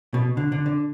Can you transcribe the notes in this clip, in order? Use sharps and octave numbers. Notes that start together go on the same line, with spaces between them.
B2
D3
D3
D3